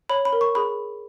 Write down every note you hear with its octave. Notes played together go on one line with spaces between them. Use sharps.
C#5 B5
B5
A#4
C#6
G#4 B5